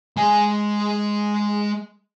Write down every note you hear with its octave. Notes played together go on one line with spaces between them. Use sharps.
G#3 G#5